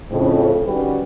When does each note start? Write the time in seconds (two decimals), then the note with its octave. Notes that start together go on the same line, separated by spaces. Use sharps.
0.11 F2 A2 C#3
0.65 D#3 G3 C#4 F#4 B4